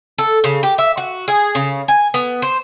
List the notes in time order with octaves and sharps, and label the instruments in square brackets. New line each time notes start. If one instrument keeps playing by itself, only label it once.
[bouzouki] A4
C#3
G4
E5
F#4
G#4
C#3
G#5
B3
C5